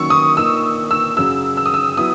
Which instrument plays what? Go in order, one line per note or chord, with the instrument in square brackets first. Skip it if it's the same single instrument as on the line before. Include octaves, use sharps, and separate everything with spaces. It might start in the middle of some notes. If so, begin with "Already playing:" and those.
Already playing: [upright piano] D#3 F#3 A#3 C#4 [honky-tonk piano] C#6 E6
[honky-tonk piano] D#6
[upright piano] A#2 A#3 D#4 [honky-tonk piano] E6
[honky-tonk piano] E6
[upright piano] F#2 C#3 F#3 [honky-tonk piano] E6
[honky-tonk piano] E6
D#6
E6
[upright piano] F#3 B3 E4 [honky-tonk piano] D#6